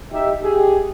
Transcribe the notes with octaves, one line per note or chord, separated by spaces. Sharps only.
D#4 G4 E5
G4 G#4